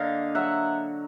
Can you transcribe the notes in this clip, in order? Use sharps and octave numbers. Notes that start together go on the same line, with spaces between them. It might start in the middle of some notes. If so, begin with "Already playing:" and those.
Already playing: D3 A#3 D#5 F5
F#3 E5 F#5